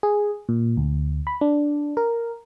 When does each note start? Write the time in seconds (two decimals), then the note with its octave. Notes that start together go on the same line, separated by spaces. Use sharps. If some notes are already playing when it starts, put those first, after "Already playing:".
0.03 G#4
0.49 A#2
0.77 D2
1.27 B5
1.41 D4
1.97 A#4